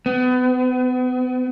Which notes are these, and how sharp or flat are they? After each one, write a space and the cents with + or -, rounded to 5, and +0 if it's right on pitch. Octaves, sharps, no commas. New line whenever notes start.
B3 +35